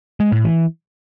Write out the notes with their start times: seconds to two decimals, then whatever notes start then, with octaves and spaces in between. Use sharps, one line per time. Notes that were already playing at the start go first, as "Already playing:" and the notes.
0.20 G#3
0.32 A2
0.44 E3